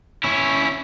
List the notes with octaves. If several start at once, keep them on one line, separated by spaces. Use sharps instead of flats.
C#4 E4